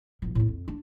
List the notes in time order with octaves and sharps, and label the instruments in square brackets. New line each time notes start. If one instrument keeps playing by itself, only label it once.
[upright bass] A1 F3
D#2 A2
F2
D4